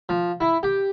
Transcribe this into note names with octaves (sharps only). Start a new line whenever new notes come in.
F3
E4
G4